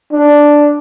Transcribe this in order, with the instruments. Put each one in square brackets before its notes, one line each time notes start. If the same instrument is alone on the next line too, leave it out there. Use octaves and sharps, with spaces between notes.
[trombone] D4